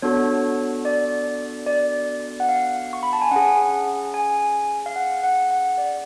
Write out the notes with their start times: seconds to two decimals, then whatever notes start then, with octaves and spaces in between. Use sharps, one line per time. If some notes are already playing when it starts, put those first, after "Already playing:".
0.02 B3 D4 F#4 A4 C#5
0.85 D5
1.66 D5
2.40 F#5
2.49 F5
2.93 C#6
3.03 B5
3.13 A5
3.22 G#5
3.31 C#4 G#4 F#5
4.14 G#5
4.86 F5
4.96 F#5
5.23 F#5
5.51 F#5
5.78 D5